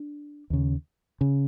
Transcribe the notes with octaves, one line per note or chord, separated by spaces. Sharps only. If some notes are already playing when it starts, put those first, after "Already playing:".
Already playing: D4
D#2 C#3
C#3